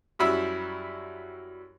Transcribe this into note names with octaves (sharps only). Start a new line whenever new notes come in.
F#2 F#3 G3 E4 B5 E6